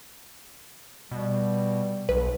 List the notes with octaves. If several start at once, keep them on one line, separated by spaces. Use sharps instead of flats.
B2 G3
B1 B4